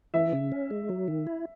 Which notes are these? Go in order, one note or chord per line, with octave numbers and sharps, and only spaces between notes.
E3 E5
C#3
C#4
G#3
F#3
D#3
E4